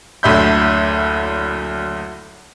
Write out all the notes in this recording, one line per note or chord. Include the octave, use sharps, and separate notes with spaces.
F#1 D2 D3 E5 B5 G6